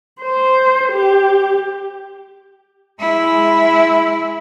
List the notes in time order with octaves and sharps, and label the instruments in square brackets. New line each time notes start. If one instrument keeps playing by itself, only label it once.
[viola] C5
G4
[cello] G#3 E4